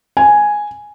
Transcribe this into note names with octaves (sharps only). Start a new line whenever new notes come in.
G#5